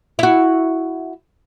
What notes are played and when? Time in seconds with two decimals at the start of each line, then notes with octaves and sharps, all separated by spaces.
0.19 E4 F#4